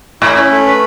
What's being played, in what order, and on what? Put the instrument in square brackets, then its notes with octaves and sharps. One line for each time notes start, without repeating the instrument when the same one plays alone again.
[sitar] A2 [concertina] E4
[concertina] C#4
A3
B4